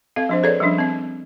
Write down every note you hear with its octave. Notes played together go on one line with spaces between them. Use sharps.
C4 A4 D#5 F5
F3 D4 C5
G#4 A4 B4 C#5 D5
F3 G3 C#4 D4
C4 D#5